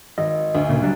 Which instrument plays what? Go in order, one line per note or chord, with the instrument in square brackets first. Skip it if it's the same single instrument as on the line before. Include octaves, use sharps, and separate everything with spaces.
[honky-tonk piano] G#1 [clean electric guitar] D#5
[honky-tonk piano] D2
[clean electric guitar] A#2 C#3
F#3 G3 D4